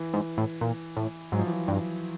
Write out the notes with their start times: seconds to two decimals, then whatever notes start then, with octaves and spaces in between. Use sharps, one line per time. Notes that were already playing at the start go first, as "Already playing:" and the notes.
Already playing: E3
0.14 G#2
0.38 A2
0.61 A#2
0.97 A2
1.32 G#2 F#3
1.39 F3
1.47 E3
1.53 F3
1.68 G2